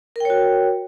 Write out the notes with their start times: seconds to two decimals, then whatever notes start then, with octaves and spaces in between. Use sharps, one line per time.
0.16 A#4
0.20 G5
0.25 C#5
0.30 F#4